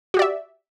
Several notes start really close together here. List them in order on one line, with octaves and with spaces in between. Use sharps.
F#4 G4 D5 E5